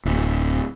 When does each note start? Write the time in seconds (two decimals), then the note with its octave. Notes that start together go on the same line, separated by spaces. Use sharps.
0.05 D1